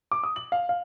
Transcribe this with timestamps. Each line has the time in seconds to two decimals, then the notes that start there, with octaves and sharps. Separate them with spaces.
0.12 D6
0.24 D#6
0.36 F#7
0.52 F5
0.69 F5